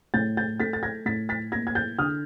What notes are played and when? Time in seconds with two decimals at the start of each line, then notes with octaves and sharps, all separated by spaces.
0.14 A2 G6 A6
0.37 G6 A6
0.60 A3 A6 B6
0.73 A6
0.83 G#6 A#6
1.06 A2 A6 B6
1.29 A6 B6
1.52 A#3 G#6 A#6
1.67 G#6
1.75 G6 A6
1.98 D3 D#6 F6